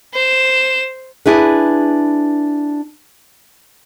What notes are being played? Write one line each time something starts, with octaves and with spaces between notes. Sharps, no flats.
C5 E7
D4 E4 G#4 B4